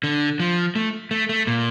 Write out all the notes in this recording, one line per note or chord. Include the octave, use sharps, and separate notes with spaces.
D3
F3
A3
A3
A3
A#2